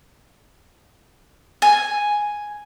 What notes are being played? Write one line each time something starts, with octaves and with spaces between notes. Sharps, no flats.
G#5